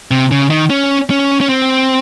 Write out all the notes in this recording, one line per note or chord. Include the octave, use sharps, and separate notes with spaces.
C3
C#3
D#3
C#4
C#4
C#4
C4